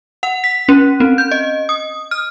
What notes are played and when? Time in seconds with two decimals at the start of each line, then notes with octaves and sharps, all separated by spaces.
0.23 F#5
0.44 B6
0.69 C#4
1.00 C4
1.18 G6
1.31 D#5
1.69 D#6
2.11 F6